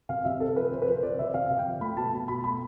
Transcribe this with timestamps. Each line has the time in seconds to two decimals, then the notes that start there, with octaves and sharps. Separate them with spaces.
0.09 C3 F5
0.25 C3 E5
0.40 C4 A4
0.56 F3 B4
0.71 C3 C5
0.82 B4
0.87 F3 C5
1.03 C4 D5
1.19 C3 E5
1.34 C3 F5
1.50 C3
1.58 G5
1.66 F3
1.81 A3 B5
1.97 B2 A5
2.12 B2
2.28 B2 B5
2.44 A3 B5